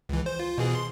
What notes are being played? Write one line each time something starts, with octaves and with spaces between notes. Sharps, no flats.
C#2 E3
C5
F4
B2 E3 G#4
C6